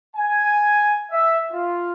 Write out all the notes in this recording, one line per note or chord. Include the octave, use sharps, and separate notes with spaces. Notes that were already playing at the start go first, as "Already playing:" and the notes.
G#5
E5
F4